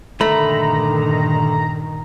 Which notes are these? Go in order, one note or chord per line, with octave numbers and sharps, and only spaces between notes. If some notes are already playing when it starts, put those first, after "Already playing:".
G2 A#2 D3 D#3 A3 A#5 B5